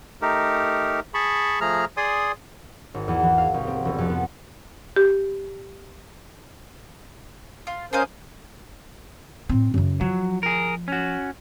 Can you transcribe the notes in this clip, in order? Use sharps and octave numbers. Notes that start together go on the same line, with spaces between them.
A3 D#4 G4 A#4
G#4 A5 B5 C#6
F3 A3 G#4 A#5 F6
G#4 D5 G#5 C6 D#6
G#1
E2
E3
F5
C2
C4
E1
F2
B3
G4
F4
C#4 G#4 A#4 C5 D#5 F5
A2 C4
F#2 C#3
F3 F#3
G#4 A#4
C#4 F#4